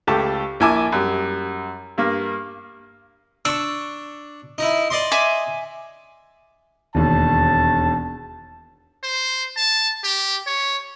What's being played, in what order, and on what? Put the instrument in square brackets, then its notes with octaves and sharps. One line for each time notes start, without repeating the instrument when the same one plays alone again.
[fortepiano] C#2 A3 G4 A5
A#1 E4 G#5 A5 D6
F#2 G3
G2 A#3
[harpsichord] D4 C#6 [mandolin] E6
[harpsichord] D#4 E4
D5 D#5 C6
[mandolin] E5 G#5 D6
[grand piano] E1 D#2 [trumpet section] A5
[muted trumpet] C5
A5
G4
C#5